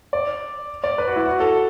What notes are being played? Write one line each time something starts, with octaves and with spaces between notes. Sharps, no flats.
D5
D5
B4
F#4
E4
F#4
A4